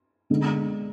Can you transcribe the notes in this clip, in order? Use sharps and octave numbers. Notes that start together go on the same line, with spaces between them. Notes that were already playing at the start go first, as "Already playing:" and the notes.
D3 G#3 B3